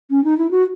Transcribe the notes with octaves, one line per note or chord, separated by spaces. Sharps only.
C#4
D#4
E4
F#4